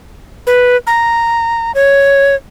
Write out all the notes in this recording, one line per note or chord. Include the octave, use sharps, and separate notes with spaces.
B4
A#5
C#5